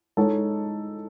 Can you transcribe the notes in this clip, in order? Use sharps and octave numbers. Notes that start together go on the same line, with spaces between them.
G#3 D#4 A4 C#5